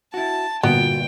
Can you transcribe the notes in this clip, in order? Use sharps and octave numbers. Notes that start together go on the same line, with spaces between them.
E4 F#4 A5
G1 A#2 B3 F#4 G5